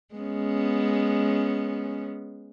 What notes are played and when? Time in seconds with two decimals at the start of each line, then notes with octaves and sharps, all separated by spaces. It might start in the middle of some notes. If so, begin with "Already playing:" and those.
0.15 G#3 B3 C#4